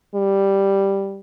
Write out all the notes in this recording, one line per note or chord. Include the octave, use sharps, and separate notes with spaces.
G3